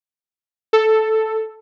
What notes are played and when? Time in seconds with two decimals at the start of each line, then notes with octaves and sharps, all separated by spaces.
0.73 A4